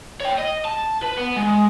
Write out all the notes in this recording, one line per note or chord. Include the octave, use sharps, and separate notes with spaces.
C#5 G5
D#5
A5
B4
B3
G#3